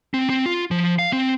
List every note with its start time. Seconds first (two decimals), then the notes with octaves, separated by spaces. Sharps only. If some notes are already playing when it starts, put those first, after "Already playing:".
0.14 C4
0.30 C4
0.46 F4
0.71 F3
0.99 F5
1.13 C4